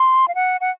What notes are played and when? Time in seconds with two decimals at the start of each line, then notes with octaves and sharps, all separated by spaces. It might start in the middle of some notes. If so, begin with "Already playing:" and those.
Already playing: C6
0.28 F5
0.35 F#5
0.61 F#5